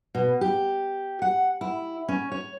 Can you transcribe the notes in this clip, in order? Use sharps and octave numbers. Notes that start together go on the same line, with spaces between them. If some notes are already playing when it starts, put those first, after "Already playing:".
B2
G4
F#5
E4
C#4
C#5